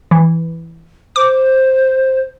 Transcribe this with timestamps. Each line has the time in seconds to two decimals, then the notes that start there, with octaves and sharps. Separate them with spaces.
0.11 E3
1.16 C5 D6